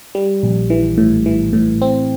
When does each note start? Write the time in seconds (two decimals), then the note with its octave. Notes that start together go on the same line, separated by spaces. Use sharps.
0.15 G3
0.43 A#1
0.70 E3
0.98 A2
1.26 E3
1.53 A2
1.82 C4